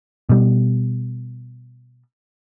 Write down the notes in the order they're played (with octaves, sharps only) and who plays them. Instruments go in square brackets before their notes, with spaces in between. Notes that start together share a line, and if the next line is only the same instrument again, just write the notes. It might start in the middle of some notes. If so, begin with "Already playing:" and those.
[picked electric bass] B2 G3